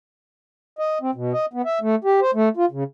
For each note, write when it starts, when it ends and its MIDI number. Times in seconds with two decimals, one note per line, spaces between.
0.79 0.98 75
1.01 1.11 60
1.15 1.33 47
1.33 1.46 75
1.53 1.62 59
1.65 1.79 76
1.81 1.95 57
2.04 2.20 67
2.21 2.31 72
2.34 2.49 57
2.57 2.66 65
2.71 2.84 49